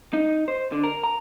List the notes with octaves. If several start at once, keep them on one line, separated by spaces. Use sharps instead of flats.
D#4
C5
D3
A#4
A#5